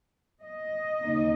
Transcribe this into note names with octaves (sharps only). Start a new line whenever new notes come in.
D#5
D#2 C#3 A#3 D#4